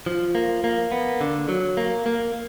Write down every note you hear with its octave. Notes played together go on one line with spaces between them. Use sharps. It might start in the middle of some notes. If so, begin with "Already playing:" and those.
F3
A#3
A#3
B3
D3
F#3
A#3
A#3